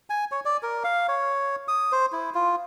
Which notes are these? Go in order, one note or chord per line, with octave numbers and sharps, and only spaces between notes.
G#5
C#5
D5
A#4
F5
C#5
D#6
C5
E4
F4